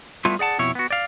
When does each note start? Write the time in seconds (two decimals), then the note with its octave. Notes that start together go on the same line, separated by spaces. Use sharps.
0.25 G3 A3 B3 E4 F4
0.39 G#4 D5 F#5 A5
0.58 F2 B2 E4 C#5
0.75 B3 F#4
0.90 D5 F5